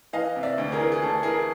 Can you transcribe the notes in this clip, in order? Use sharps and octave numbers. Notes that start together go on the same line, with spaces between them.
E3 D#5 F5
C3
D5 E5
D2
G#4 A#4
E3
G#4
D2 A4
E3 G#4 A#4